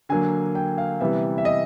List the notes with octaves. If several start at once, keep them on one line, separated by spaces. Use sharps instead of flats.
D3 F#3 A#3 G#5
G5
F5
C3 E3 G3 B3 E5
E5
D#5